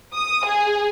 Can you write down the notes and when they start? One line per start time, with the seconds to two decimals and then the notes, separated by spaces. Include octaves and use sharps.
0.16 D#6
0.48 G#4